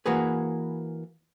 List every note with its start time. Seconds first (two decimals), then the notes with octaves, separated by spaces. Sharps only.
0.06 E3 A#3 F#4 G#4 B4